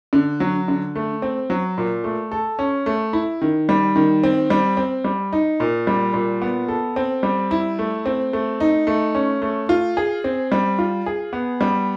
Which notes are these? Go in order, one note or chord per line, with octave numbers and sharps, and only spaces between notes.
D3
F#3
D3
A3
C4
F#3
A#2
A3
A4
C#4
A3
E4
D#3
G3
D#3
C4
G3
C4
G3
D#4
A#2
G3
A#2
B3
A4
C4
G3
E4
A3
C4
A3
D#4
A3
C#4
A3
F4
G#4
C4
G3
F4
G#4
B3
G3